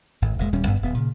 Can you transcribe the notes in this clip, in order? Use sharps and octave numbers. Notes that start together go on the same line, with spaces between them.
G#1 A2
E1 A#2 G#3
D#1 G3 C#4
G1 G2 B3
D1 B3
A#2 C#3